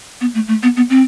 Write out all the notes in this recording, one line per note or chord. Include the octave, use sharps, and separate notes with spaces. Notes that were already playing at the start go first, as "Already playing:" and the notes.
B3
A3
A3
B3
B3
C4